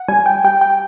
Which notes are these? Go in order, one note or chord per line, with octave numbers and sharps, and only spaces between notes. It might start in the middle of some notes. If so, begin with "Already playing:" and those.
Already playing: F#5
G3 G#5
G5
G3 G5
G5